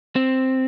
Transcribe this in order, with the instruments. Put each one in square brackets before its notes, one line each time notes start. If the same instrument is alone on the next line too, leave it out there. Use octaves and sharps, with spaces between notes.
[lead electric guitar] C4